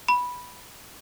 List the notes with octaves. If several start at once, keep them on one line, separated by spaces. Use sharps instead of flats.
B5